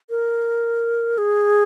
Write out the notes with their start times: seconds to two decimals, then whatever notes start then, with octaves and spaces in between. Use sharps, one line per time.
0.10 A#4
1.18 G#4